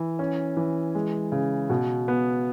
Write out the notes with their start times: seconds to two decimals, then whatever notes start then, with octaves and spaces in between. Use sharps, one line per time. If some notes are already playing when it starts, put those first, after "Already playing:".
Already playing: E3
0.19 C#4
0.57 E3
0.95 G#3
1.32 C#3
1.70 B2
2.08 B3